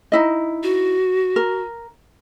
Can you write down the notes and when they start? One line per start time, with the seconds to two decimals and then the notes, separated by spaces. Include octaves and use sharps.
0.12 D#4 E4 D#5
0.63 F#4
1.36 A#4